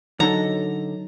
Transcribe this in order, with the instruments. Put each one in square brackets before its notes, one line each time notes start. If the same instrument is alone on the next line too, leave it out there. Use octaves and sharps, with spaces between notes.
[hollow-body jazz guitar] D3 A4 [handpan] F#3 D#4 [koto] A#5